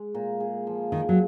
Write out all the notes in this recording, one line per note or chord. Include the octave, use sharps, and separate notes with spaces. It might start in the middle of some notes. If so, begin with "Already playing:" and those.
Already playing: G#3
A#2
G#4
F3
D#3 G#4
F#3